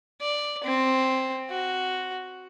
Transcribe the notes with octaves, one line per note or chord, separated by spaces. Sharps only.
D5
C4
F#4